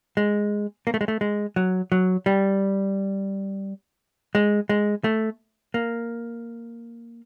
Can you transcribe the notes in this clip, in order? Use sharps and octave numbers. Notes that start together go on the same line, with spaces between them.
G#3
A#3
A3
G#3
A3
G#3
F#3
F#3
G3
G#3
G#3
A3
A#3